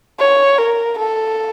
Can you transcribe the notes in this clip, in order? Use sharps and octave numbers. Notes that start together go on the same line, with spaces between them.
C#5
A#4
A4